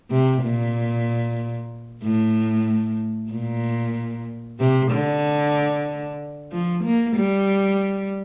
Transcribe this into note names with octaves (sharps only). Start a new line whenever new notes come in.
C3
A#2
A2
A#2
C3
D3
F3
A#3
G3